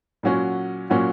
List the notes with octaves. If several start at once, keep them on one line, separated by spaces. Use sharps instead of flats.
A#2 F#3 C#4 F#4
A#2 F#3 C#4 F#4